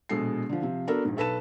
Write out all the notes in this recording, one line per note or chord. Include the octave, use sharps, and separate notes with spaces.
A#1 B2 G#3 A4 C7
D3 F3
C3 F3
B3 D4 F#4 A4 A#4
A#1 G#2
B1 A4 B4 A5 E7